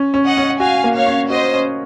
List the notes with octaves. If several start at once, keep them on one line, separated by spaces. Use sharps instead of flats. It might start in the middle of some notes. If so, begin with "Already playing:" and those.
Already playing: C#4
C#4
D#5 F#5
C#4
F#4 F5 G#5
A#3
C#5 F5
C#4
F#4 C5 D#5
C#4